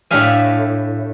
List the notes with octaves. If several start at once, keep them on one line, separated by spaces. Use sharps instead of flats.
A2 A3 D4 G4 F5 G#5